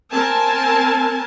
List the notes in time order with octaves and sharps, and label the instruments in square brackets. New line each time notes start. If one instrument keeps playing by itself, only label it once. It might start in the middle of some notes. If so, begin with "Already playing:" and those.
[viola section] C4 A#4 G#5 A5